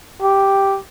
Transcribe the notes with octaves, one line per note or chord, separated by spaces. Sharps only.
G4